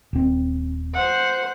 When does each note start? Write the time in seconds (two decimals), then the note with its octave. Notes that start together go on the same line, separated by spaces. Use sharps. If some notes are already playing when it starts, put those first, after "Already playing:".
0.13 D#1 C4
0.94 C5 F#5